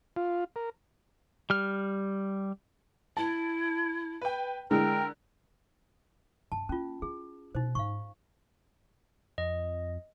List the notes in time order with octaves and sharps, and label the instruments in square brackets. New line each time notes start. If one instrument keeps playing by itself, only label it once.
[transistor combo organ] F4
A#4
[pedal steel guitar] G3 F6
[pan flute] E4 [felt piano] A5
[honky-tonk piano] B4 G5
[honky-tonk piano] D3 [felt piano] G#3 E4 G#4 [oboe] A#4 [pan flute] G5
[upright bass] G2 [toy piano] A5
[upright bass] A#3 [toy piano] C#4 F4
[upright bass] E4 [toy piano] G#4
[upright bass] B2 [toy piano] D#4 C5
[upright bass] G#2 [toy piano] F5 C#6
[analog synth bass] F2 [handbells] D#5